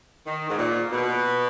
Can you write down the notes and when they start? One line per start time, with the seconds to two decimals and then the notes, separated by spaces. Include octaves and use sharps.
0.26 D#3
0.49 G#2
0.58 A#2
0.92 B2